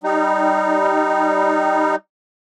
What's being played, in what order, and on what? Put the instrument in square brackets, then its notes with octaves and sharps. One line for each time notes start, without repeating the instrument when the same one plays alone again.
[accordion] G3 D#4